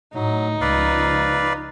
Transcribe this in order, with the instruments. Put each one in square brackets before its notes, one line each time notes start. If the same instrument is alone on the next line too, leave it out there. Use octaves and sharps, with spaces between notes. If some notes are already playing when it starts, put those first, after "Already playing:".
[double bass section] A2 [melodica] F#3 [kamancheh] D#4
[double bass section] C#2 F3 [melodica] B4 D5 F5